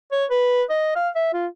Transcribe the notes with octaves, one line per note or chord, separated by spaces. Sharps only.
C#5
B4
D#5
F5
E5
F4